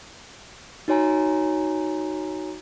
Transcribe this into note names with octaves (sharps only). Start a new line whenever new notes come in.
D#4 F#4 C#5 G#5 A#5